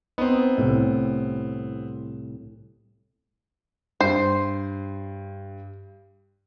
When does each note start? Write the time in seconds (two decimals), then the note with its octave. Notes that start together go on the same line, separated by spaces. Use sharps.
0.18 B3 C4 D#4
0.58 C2 A2
4.01 G2 C5